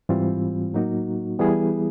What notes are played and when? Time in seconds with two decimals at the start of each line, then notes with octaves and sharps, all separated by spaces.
0.09 G#2 E3 G3 C4 F4
0.74 A2 F#3 A#3 D#4 F#4
1.39 E3 G3 B3 E4 G#4